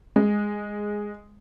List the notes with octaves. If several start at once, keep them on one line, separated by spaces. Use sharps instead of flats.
G#3